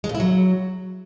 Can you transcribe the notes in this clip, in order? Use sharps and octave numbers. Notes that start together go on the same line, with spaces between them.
G#3
A#2
E4
F#3